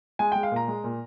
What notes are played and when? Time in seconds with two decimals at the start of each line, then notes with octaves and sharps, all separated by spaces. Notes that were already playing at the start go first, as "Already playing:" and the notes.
0.19 G#3 G#5
0.32 G#3 G5
0.43 F5
0.52 A#2 A#5
0.68 G#3
0.84 A#2